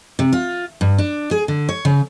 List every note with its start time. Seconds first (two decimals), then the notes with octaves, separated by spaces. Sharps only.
0.19 C3
0.33 F4
0.81 G2
0.98 D4
1.31 G#4
1.48 D3
1.69 C#5
1.85 C#3